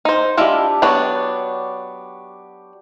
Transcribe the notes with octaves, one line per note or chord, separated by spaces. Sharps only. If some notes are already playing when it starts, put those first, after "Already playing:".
D#4 C5
G#3 D4 E4 F4 G4
F#3 B3 D4 G5 C#6 D6